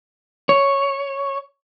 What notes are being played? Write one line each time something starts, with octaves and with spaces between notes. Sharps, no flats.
C#5